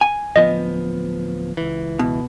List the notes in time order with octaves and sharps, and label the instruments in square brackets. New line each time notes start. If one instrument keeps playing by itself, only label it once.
[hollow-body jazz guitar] G#5
[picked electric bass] D1 F3 B3 [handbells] D#5
[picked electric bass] C#2 E3
[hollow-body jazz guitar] B2